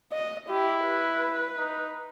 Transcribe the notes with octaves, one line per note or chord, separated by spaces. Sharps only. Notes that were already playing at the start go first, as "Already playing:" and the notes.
D#5
E4 G4
B4
D#4